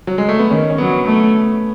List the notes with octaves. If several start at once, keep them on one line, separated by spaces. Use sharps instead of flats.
F#3
G#3
A3
B3
D#3 C#4
C#4
F#3 B3
A3